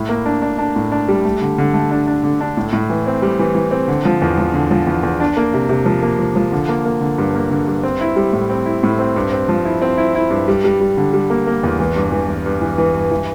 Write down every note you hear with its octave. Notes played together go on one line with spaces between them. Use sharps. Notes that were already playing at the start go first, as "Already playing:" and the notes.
Already playing: A2 E4
A#3
D4
D4
D4
A2
D4
G3
A3
D3
D3
A3
D4
D4
D3
D4
A2
A2
E3
C4
G3
E3
E3
C4
D3
F3
E2
F3
D3
F3
E2
E2
D4
A#3
C3
C3
F3
A#3
F3
F3
D3
A#3
A#3
D3
G2
A#3
D3
G2
C4
E4
G3
A2
C4
E4
A2
C4
G2
C4
F3
E4
C4
E4
E4
G2
G3
G3
G3
D3
G3
A#3
A#3
E2
E3
G2
E3
E3
G2
E3
E3
G2
E3